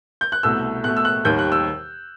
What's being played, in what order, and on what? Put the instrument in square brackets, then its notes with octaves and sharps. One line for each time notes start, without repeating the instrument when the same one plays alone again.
[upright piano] G6
F#6
C2 B2 A3 E6
B2 A3 F#6
E6
F#6
D#2 D#3 G3 G6
F#6
E6